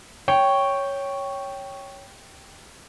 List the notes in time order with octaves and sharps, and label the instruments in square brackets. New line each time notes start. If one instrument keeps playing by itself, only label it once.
[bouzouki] C#5 [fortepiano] G5